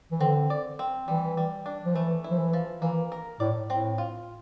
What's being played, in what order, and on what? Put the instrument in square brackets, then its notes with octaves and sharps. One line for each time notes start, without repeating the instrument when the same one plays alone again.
[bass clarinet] E3
[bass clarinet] D3 [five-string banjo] C4
[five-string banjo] D5
C4
[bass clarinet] E3 [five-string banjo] G3
[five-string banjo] G3
D4
[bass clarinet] F3
[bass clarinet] E3 [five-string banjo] A3
[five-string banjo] E4
[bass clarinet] F3
E3
[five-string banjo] F3
[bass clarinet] E3 [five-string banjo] A#3
[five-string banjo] A#4
[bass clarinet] A2 [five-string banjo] D5
[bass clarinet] A2 [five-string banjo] C4
[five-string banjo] F4